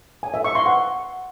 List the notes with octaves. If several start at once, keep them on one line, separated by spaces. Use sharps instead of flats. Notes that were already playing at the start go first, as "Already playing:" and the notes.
G#5
E5
C#6
C6
F#5